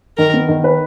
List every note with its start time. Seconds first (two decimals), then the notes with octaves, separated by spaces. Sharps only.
0.18 D#3 A#4
0.34 B3
0.48 D#3
0.64 B4